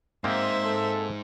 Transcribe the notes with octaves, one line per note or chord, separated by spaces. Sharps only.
G#2 G#3 A#3 C4 C5 E5
A4